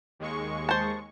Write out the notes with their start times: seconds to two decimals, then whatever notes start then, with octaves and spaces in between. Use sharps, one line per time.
0.20 D#2 G#3 C#6
0.69 C5 A5